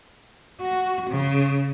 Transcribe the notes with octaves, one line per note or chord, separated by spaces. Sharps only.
F#4
C#3